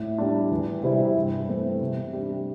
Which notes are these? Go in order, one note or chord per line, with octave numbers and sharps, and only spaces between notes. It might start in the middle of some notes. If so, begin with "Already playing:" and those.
Already playing: A2
G3 D4
E2
C3 G3 C4 E4
G2
E3 A3 C4
C3
G3 D4